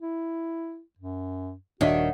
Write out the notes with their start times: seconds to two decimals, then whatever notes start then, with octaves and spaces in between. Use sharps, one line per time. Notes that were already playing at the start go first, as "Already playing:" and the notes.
0.02 E4
0.99 F#2
1.81 D#1 D#3 D4 F#4 C#5 E5 F#5